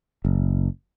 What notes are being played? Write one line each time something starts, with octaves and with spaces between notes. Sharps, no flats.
F#1